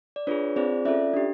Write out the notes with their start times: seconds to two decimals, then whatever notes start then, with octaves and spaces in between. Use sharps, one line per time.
0.16 D5
0.27 D4 F4 G#4 B4 C#5
0.56 C4 F4 G#4 C5 D5
0.85 C#4 F4 A4 D5 E5
1.14 D4 G4